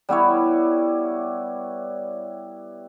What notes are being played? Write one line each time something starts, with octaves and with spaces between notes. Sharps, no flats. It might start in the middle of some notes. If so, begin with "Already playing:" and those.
G3 B3 E4 C#5